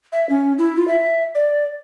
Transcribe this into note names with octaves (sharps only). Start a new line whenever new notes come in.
E5
C#4
E4
F4
E5
D5